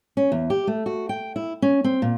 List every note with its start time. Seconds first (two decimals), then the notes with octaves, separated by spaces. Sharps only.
0.17 C#4
0.32 E2
0.50 G4
0.67 A3
0.86 F#4
1.09 G5
1.36 E4
1.62 C#4
1.84 C4
2.02 A#2